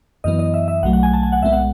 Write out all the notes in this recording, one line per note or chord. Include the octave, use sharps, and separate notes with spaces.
F#2 E3 B3 D#5
D#5
E5
E5
B1 B2 F#3 A3 F#5
F#5
G#5
A5
G#5
F#5
B1 A2 G#3 B3 E5
F#5